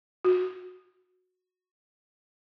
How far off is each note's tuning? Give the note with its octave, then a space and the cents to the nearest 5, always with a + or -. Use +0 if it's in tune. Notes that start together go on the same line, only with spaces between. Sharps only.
F#4 -15